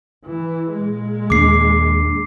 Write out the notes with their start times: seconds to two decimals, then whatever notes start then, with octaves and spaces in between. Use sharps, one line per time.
0.25 E3
0.72 A#2 G#3
1.30 D#2 A#3 D4 D6 C7